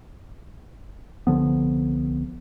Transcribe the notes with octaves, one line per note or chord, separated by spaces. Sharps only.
C2 D3 F3 B3